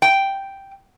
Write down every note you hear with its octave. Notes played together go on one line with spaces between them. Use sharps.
G5